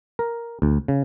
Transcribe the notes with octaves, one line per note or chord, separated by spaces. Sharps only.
A#4
D2
C#3